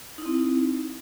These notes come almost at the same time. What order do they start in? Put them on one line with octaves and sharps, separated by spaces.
D#4 E4 C4